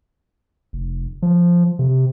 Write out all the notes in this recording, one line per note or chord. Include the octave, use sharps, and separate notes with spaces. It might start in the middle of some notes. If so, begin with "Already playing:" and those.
F1
F3
C3